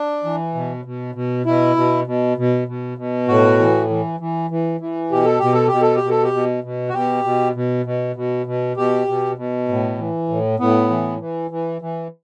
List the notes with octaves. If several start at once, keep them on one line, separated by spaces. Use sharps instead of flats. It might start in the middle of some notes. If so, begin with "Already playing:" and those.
Already playing: D4
E3
B2
B2
B2
B2 E4
B2
B2
B2
B2
B2
A2 F#4
E3
E3
E3
E3
E3
B2 G4
A4
B2 G4
A4
B2 G4
A4
G4
B2
A4
G4
B2
B2
F#4
B2 G4
B2
B2
B2
B2
B2
B2 G4
B2
B2
A2
E3
A2
A2 B3
E3
E3
E3
E3